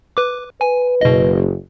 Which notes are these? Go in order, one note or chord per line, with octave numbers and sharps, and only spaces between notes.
B4 D6
B4 G#5
F#1 B2 D#5